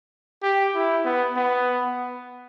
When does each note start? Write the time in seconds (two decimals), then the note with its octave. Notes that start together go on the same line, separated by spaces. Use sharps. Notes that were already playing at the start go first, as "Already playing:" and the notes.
0.42 G4
0.74 E4
1.05 B3
1.36 B3